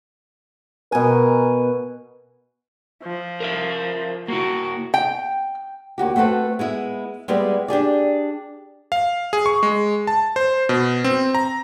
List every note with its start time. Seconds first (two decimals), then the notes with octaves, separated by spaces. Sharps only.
0.92 B2 A#4 G#5
3.04 F3
3.40 A#4 C5 E5
4.28 A#3 E4 F#4
4.94 G5
5.98 D#2 F#4 G4
6.16 A3 C4 F#4 A4 B4
6.59 G#3 B3 E4
7.28 G3 G#3 B3 E4 B4 D#5
7.68 D4 G4 G#4 D5
8.92 F5
9.33 G#4
9.46 C#6
9.63 G#3
10.07 A5
10.36 C5
10.69 B2
11.04 C4
11.35 A#5